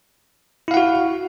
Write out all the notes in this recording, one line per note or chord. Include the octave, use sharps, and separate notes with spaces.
E4 F#4 F5 F#5